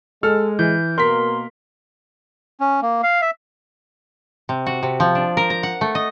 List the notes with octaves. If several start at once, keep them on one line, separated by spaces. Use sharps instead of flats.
G#3 A4 F6
E3 G6
B2 A#3 A#4 C6 B6
C#4
A#3
F5
E5
C3
F#4
C3
F3
D4
A#4
A#5
F#5
A3
D#5